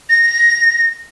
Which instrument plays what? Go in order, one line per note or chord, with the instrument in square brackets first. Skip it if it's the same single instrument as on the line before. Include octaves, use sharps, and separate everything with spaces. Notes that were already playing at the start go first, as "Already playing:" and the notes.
[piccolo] A#6